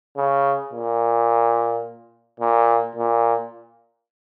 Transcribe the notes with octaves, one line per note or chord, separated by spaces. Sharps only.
C#3
A#2
A#2
A#2